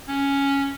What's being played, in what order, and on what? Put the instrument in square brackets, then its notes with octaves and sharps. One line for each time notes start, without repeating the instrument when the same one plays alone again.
[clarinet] C#4